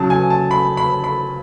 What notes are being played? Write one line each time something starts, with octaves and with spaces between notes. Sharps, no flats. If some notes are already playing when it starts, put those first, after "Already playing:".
Already playing: C#3 F#3 A5
G#5
A5
B5
B5
B5